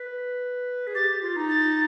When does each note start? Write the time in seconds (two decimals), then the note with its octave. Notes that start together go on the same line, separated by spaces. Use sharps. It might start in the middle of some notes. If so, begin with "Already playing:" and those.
Already playing: B4
0.87 G#4
0.95 G4 A6
1.22 F4
1.36 D#4
1.49 A6